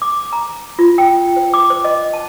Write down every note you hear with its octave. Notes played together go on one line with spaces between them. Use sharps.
D6
A#5
F4
G5
C5
D6
C5
D#5
A5